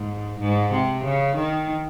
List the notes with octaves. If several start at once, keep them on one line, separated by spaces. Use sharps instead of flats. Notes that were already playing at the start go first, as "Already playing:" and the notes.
Already playing: G#2
G#2
C3
C#3
D#3